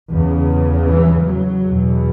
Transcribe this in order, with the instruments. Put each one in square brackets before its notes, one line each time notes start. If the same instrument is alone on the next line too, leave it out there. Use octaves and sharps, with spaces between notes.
[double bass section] E2 C#3
E3
F#3
E2 B2